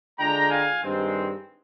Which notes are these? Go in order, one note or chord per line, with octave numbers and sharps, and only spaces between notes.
D3 G#3 D4 F4 G5 A#5
F5 G#5
G2 D#3 G#3 C4